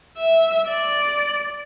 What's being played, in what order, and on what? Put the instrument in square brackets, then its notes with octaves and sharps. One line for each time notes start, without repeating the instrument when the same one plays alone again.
[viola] E5
D5